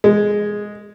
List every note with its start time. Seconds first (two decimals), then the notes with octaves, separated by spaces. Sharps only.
0.04 G#3